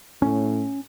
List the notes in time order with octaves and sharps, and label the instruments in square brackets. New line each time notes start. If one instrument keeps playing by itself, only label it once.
[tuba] A2 [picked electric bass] C#4